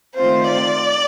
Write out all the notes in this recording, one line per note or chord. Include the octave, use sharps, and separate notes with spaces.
D#3 A3 C4 F4 C5
D5